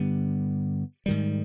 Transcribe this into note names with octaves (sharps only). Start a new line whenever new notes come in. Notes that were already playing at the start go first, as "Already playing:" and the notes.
Already playing: G2 D3 G3 B3
G#2 D#3 G3